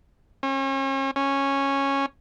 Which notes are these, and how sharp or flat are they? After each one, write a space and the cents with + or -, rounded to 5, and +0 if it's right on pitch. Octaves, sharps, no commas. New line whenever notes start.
C#4 -40
C#4 -10